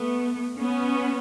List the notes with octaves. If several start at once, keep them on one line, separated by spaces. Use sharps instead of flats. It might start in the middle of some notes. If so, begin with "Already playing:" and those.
Already playing: A3 B3
B3 C#4